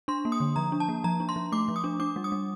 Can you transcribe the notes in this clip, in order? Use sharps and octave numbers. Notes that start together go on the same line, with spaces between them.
D4 C6
A#3
D#6
D3
F3 A#5
D4
A5
A#3
F3 A#5
D4
C6
F3
A3 D6
F3
D#6
D4
D4 D6
G3
D#6
G3